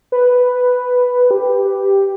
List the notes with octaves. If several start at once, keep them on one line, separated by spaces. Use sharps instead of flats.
B4
G4